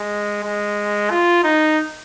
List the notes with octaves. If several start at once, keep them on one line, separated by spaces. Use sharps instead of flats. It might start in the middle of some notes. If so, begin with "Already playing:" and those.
Already playing: G#3
G#3
F4
D#4